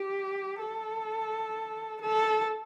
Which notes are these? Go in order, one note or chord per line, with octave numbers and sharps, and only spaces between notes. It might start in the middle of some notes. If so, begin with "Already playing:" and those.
Already playing: G4
A4
A4